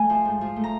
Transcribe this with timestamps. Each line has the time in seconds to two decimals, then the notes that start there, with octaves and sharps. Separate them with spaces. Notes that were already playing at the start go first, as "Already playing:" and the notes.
Already playing: A3 G#5
0.10 F3
0.25 G#2
0.41 F3
0.56 A3
0.64 A#5